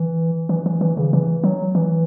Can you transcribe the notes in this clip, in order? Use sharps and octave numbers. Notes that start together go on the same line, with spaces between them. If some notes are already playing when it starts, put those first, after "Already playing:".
Already playing: E3
E3
E3
E3
C#3
E3
F#3
E3